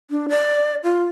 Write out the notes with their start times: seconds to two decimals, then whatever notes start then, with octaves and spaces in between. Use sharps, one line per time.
0.11 D4
0.29 D5
0.84 F4